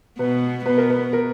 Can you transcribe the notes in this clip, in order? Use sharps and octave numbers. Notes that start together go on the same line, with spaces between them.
B2 B3 B4
B2 B3 B4
A#4
B4
A#4